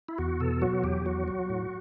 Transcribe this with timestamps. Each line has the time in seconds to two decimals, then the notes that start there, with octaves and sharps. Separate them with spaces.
0.08 E4
0.18 E2 F#4
0.40 B2 A4
0.62 F#3 F#4
0.84 E2 G4
1.06 F#3 F#4
1.28 F#3
1.50 A2